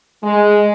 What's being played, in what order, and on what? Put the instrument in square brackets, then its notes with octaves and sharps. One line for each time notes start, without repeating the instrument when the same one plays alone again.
[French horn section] G#3